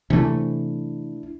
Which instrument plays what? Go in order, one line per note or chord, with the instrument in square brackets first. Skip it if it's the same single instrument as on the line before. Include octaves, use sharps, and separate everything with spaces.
[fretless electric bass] C3 E3 A3 [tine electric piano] D4 E4